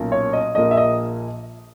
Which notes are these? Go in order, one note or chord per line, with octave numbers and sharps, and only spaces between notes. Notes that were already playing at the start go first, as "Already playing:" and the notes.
Already playing: B1 A#2 A#3 C#4
C#5
D#5
A#1 A#2 A#3 D#5
E5
D#5